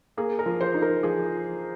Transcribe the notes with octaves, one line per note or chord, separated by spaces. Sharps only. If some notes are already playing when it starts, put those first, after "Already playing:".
A#3 G#4
A#4
F3
C5
D#4
A#4
F3 G#4